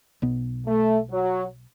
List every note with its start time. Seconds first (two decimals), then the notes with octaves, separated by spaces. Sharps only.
0.22 B1 B2 B3
0.67 A3
1.11 F#3